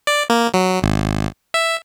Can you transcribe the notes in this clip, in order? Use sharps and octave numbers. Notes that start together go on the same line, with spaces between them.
D5
A#3
F#3
G#1
E5